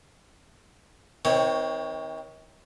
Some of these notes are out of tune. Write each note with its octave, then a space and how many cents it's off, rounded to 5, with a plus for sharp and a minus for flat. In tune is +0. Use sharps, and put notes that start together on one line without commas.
D#3 +40 C4 +0 C#5 +0